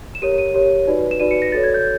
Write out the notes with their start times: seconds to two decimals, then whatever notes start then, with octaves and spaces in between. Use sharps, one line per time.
0.15 E7
0.22 G4 A#4 C#5 D#7
0.38 D#7
0.54 G4 A#4 C#5
0.87 D#4 F#4 B4 D5
1.11 E7
1.20 D#4 F#4 B4 D5 D#7
1.31 C#7
1.42 A#6
1.52 F#4 A4 C#5 A6
1.63 G#6
1.74 G6